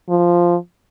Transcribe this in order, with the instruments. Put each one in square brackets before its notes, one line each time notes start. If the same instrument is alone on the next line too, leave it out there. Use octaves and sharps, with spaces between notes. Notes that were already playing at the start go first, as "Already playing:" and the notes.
[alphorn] F3